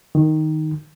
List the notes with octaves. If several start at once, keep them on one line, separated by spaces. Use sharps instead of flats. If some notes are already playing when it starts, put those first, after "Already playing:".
D#3